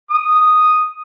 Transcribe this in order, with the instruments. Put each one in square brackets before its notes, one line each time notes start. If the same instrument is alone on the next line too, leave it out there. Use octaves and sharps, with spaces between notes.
[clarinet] D#6